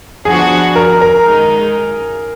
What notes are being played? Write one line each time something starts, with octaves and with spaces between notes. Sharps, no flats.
F3 B3 D4 F#4 G#4
A#4
A#4
F#2 D#3 G#3 D#4